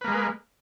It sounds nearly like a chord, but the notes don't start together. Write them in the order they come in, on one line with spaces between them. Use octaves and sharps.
B4 A#3 G#3